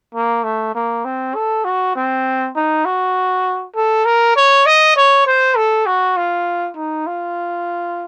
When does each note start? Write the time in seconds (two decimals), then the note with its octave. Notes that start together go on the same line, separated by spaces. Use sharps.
0.15 A#3
0.44 A3
0.75 A#3
1.05 C4
1.35 A4
1.65 F#4
1.96 C4
2.56 D#4
2.85 F#4
3.75 A4
4.05 A#4
4.36 C#5
4.66 D#5
4.96 C#5
5.27 C5
5.57 A4
5.86 F#4
6.17 F4
6.77 D#4
7.07 F4